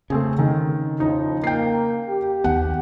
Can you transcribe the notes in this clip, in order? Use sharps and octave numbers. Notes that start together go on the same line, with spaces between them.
C#3 A3 C4 G#4
D#3
A2 F3 D#4
A#3 G5 C7
G4
D#2 B3 F#5